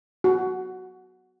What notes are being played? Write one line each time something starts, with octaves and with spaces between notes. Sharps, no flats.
F#4